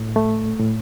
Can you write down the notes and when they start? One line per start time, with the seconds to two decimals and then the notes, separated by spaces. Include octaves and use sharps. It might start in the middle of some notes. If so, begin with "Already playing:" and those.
Already playing: A2
0.16 A3
0.59 A2